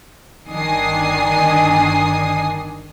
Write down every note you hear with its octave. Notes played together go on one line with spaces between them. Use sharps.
G1 D#3 D4 G#5 D#6 C7